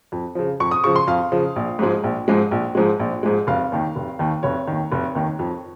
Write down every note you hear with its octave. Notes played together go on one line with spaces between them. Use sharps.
F2
C#3 F3
F2 C#6
D#6
C#3 F3 C#6
C6
F2 F5
C#3 F3
A#1
G#2 F3 G#3
A#1
G#2 F3 G#3
A#1
G#2 F3 G#3
A#1
G#2 F3 G#3
F1 F5
D#2 D#3
F1
D#2 D#3
F1 C#5
D#2 D#3
F1
D#2 D#3
F2